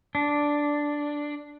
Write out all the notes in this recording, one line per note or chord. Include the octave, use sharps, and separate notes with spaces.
D4